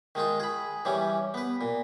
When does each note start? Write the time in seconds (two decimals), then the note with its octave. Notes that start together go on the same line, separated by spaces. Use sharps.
0.15 D#3 G#3 D#4 F4
0.40 G#4 B5
0.85 E3 G3 C#4
1.34 B3 B4
1.61 A#2